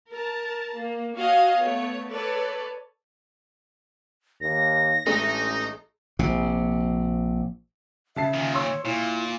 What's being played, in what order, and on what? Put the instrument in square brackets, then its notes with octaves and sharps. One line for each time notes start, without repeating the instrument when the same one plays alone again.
[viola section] A#4 A5
A#3
F#4 C#5 D#5 F5 G#5
A3 B3 C#5
A4 B4 C#5 D5
[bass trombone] D#2 [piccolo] A#6
[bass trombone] A1 [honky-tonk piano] G#3 A3 D4 [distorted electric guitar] D#4
[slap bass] A#1 C3
[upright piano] C#3 A5 C7 [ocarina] E5
[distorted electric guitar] A#2 D#3
[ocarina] C#5 [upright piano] C6 C#6 E6
[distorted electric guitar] A#2 [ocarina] E4